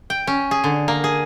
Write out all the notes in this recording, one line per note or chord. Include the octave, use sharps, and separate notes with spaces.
G5
C#4
G#4
D3
A#3
G#4